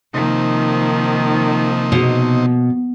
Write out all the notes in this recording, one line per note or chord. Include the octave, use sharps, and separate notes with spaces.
C3 D#3 F3 A#3 D#4
B2